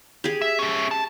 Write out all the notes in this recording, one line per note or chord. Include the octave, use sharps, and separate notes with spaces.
G4 G#4
E5
C#4 E5
A5